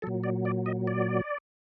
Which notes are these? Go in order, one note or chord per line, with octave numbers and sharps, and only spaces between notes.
A#2 F#3 A4
D5
D5
D#5
D5